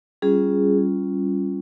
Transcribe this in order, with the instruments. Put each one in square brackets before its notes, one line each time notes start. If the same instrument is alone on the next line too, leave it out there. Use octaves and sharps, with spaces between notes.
[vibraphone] G3 C#4 F4 G#4